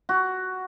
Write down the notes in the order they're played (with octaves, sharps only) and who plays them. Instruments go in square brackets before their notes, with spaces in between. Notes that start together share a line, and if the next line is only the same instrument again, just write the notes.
[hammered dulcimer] F#4